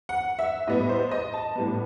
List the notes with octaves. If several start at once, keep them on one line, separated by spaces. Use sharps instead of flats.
F#5
E5
A2 G3 B3 D#5
C5
D#5
A5
A2 G3 B3